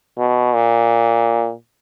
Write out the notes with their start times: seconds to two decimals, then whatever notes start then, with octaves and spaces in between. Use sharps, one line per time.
0.18 B2
0.54 A#2